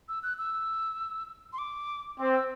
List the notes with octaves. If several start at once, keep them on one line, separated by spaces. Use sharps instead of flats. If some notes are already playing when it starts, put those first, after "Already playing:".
E6
F#6
E6
C6
D6
C4 D6
E6